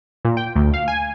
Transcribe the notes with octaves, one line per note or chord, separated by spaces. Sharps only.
A#2
G5
D2
F5
G#5